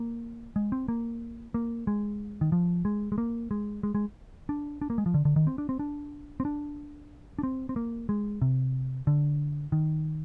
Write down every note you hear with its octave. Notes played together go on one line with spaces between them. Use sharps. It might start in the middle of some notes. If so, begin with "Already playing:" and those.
Already playing: A#3
G#3
C4
A#3
A#3
G#3
D#3
F3
G#3
G#3
A#3
G#3
G#3
G#3
D4
D4
A#3
G#3
F3
D3
D3
D#3
C4
D4
C4
D4
C4
D4
D4
C4
C4
A#3
G#3
C3
D3
D#3